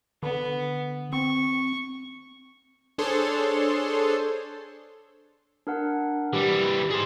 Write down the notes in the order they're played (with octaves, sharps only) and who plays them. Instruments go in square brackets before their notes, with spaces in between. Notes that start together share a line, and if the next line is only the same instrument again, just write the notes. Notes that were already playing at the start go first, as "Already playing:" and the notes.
[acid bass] D3 [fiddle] B3
[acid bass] C4 [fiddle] C#6
[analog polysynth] D4 G#4 A4 C5 C#5 C6
[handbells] D4 A#4 F#5
[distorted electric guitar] E3 G3 [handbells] G4
[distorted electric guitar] G#4 C5